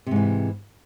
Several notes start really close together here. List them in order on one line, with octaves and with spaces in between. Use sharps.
C3 G#2 E3